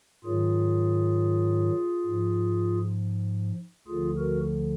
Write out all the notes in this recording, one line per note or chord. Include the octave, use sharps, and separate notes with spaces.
G#2 D#3 F#3 F4 G#4
G#2 F3
D2 D3 F3 F4 G#4
F#4 A#4